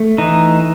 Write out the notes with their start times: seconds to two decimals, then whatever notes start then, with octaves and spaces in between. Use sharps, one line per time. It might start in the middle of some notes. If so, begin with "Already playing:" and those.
Already playing: A3
0.18 E3 D#4